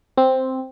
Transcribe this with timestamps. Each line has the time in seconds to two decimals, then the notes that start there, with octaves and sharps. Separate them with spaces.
0.18 C4